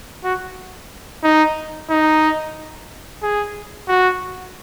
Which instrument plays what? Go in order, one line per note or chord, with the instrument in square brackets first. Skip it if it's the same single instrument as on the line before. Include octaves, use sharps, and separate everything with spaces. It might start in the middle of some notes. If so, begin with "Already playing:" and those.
[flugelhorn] F#4
D#4
D#4
G#4
F#4